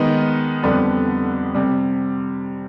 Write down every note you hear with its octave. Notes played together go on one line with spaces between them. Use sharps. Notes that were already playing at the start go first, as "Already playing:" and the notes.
Already playing: D#3 G#3 B3 D#4
F2 D3 G3 B3
C3 G3